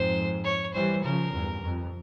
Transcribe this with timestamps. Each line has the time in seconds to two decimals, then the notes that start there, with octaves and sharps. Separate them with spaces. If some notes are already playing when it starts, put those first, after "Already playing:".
Already playing: F2 G#2 C5
0.44 C#5
0.74 E3 G3 C5
1.03 C#3 F3 A#4
1.33 E2 G2
1.62 F2